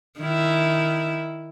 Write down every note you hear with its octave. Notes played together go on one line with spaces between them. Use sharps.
D#3 E4